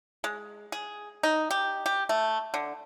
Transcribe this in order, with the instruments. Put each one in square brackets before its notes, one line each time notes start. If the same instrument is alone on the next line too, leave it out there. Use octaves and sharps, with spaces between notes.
[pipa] G#3
G#4
D#4
G4
G4
A3
D3